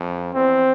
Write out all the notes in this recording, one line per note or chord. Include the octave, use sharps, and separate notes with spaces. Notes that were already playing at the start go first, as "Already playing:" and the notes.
Already playing: F2
E2 C4